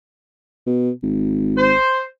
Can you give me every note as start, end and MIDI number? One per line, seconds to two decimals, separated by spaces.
0.66 0.90 47
1.03 1.73 32
1.57 2.01 72